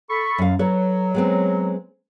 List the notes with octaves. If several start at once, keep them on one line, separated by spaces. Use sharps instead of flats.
A4 B5 C#6
F#2 F5
F#3 A4 B4 C#5
G#3 B3 C4